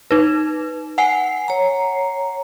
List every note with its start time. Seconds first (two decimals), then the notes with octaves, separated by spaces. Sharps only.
0.11 D#4 B4
0.98 F#5 G#5 C7
1.48 C#5 A#5